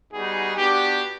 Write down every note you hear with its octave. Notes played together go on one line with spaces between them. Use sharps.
G3 B3 D#4 F#4 G#4
B3 D4 F#4 G4